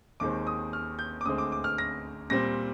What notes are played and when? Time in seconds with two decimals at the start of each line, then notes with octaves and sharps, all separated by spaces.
0.20 D#2 D#3 G#3 C4 D6
0.47 D#6
0.73 F6
0.99 G6
1.21 D6
1.26 D2 D3 G#3 C4 D#6
1.38 D6
1.52 D6
1.64 F6
1.78 A#6
2.30 A#2 G3 C4 A#6